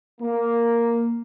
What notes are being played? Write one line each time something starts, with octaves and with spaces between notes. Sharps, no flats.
A#3